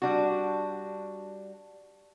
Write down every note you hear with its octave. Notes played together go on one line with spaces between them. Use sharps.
G3 D4 F#4